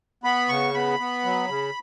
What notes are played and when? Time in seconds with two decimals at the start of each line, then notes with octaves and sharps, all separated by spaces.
0.24 B3 B5
0.49 C#3 C#6
0.74 B3 B5
0.99 B3
1.24 F#3
1.49 C#3